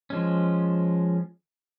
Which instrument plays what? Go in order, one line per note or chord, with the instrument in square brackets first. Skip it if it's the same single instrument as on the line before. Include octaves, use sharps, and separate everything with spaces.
[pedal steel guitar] F3 G#3 C#4